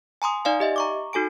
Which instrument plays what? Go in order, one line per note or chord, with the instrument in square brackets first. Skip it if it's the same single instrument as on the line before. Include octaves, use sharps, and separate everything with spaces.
[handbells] G#5 A#5 C6 D#6
D#4 D5 F5 G#5
G4 D#5 E5
A#5 C#6 D6
D#4 F#4 A4 G#5 D7